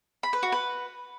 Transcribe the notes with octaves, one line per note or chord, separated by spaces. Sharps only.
B5
B4
F#4
B4